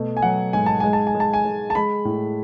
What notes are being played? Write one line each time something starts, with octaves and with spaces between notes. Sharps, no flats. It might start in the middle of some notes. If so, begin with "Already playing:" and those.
Already playing: B2 A3
G#5
F#3 F#5
G#2 G#5
A5
G#3 G#5
A5
G#5
G#3
A5
G#5
G#3
A5
G#3 B5
A2